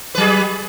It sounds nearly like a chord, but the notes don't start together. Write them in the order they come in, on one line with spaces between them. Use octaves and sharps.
B4 F#3 G#4